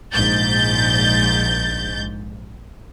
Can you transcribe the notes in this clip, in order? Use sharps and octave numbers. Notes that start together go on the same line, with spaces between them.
A#1 G#2 G6 A6